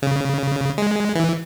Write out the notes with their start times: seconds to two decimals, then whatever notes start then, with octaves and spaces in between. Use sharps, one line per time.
0.02 C#3
0.78 G#3
1.15 E3